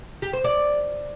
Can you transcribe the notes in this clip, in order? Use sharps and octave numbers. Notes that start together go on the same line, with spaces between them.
G4
C5
D5